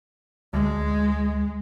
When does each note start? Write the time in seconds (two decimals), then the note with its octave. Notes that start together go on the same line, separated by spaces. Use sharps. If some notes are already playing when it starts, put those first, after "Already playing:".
0.54 D2 G#3